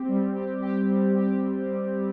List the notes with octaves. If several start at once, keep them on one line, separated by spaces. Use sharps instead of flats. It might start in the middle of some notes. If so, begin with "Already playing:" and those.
Already playing: C4 G4
G3
G4
G4
G3
G4
G3
G3
G3